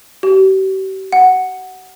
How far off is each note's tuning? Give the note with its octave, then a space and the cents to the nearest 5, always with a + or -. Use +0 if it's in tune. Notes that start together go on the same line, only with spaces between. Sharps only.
G4 -40
F#5 +0